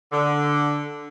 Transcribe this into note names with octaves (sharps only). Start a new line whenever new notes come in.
D3